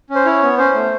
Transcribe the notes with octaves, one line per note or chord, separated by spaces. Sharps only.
C#4
C5
E4 C#5
B3
C#4 C5
A3